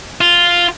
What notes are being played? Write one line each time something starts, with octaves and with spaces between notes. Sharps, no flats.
F4